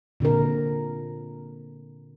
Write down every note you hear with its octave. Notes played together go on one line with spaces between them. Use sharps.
A#2 D3 C4 A#4